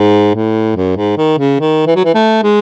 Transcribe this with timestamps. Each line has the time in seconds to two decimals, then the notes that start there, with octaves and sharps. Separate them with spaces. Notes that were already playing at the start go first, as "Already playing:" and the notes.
Already playing: G#2
0.35 A2
0.76 F#2
0.97 G#2
1.17 D#3
1.38 C#3
1.60 D#3
1.87 E3
1.96 F#3
2.04 E3
2.14 A3
2.43 G#3